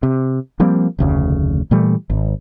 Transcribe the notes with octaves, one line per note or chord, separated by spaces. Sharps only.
C3
F3 G3 A#3 C4
F1 D2 C#3
A#2 E3 G3 A3
G#1